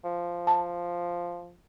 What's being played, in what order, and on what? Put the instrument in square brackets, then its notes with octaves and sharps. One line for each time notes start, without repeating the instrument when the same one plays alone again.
[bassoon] F3
[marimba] A5